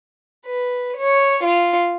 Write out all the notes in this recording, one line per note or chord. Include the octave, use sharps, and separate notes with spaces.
B4
C#5
F4